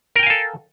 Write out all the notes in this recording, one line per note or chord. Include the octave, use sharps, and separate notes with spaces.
A4 A#4 F5 G5 G#5